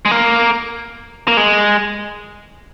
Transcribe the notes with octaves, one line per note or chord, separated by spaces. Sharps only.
G#3
A#3
A#3
G#3